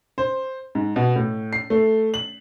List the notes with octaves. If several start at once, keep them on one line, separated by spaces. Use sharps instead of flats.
C5
G#2
B2
A2
C7
A3
F#7